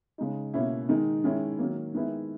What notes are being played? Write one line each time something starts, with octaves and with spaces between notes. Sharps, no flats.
C#3 G#3 D#4
B2 A#3 C#4 E4
D#3 G#3 D#4
D#3 G#3 C#4 E4
D#3 F#3 A#3
D#3 G#3 B3 E4